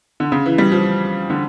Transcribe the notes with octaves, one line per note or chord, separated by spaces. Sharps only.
D3
C#3
E3
G3
F3
D3